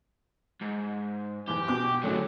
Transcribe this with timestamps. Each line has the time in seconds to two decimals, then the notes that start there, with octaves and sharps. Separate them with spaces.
0.61 G#2
1.48 F#1 E3 G4
1.68 B2 D6
2.03 D2 F#3 A3 C#4 F#4